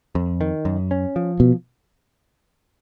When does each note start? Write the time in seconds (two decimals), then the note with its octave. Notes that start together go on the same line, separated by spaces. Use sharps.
0.15 F2
0.41 D#3
0.65 F#2
0.91 C#4
1.16 F3
1.40 B2